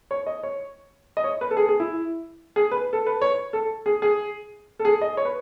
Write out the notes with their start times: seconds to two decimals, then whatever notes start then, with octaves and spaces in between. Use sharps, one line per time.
0.11 C#5
0.26 D#5
0.43 C#5
1.17 D#5
1.24 C#5
1.41 B4
1.51 A4
1.57 G#4
1.69 G#4
1.80 E4
2.56 G#4
2.71 B4
2.93 A4
3.07 B4
3.22 C#5
3.53 A4
3.86 G#4
4.02 G#4
4.79 A4
4.85 G#4
5.01 D#5
5.17 C#5
5.25 B4